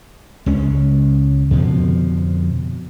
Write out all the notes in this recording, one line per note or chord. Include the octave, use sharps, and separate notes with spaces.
C#2 G#3 C#4
F2 B2 D3 F3